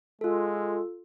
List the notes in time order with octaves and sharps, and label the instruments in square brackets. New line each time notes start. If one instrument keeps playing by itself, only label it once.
[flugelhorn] G#3 [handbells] F4 A4